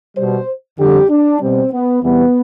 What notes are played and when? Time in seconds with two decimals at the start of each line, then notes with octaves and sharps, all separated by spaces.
0.16 B2 G3 C5
0.78 F2 D3 G3 G4
1.10 D4
1.40 B2 G3 C4
1.72 B3
2.03 E2 C3 E3 G3 B3